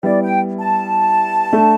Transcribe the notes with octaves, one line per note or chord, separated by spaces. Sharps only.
G3 B3 E4 D5
G5
A5
A3 D4 A4